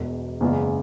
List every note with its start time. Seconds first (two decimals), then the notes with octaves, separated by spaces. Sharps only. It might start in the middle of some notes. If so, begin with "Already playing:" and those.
Already playing: E1 E2 B2
0.40 F#1 E2 C#3 E3 G#3